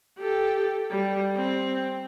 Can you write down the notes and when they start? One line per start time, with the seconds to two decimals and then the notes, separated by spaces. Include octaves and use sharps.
0.19 G4 A4
0.91 G3
1.36 C4